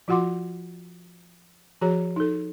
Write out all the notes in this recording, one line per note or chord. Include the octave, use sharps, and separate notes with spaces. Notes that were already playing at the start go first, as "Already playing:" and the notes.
F3 F4 F#4 F#5 C6 D6
F3 F#4 G#4 C#5 A#5
D#4 A4